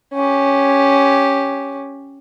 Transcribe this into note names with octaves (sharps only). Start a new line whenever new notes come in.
C#4 G4